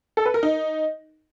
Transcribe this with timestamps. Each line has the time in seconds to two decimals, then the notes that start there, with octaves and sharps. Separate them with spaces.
0.17 A4
0.26 B4
0.34 A#4
0.43 D#4